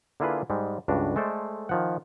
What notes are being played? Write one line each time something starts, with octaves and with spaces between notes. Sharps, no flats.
D3 A#3 E4 F4 G#4 B4
G#2 G3 G#3
C#2 G2 D4 F#4
G#3 A3 A4 C5 D5
D#3 F3 F#5